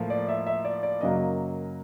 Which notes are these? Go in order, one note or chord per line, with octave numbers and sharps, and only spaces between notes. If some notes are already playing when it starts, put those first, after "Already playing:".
Already playing: A2 F3 A#3
D5
E5
E5
D5
D5
F#2 C#3 F#3 A#3 D#5